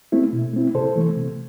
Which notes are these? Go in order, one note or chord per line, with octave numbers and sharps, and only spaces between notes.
A3 C4 E4
B2
A3 C4 E4
C3 A4 C5
E3 A3
C3